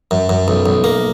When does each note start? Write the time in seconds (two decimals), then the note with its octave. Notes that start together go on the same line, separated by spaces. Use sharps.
0.11 F#2
0.29 F#2
0.48 B1
0.66 B1
0.84 A#3